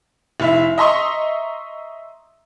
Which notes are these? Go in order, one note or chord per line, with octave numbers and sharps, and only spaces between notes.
F1 E4 E5
D#5 E5 A#5 C6 C#6 D#6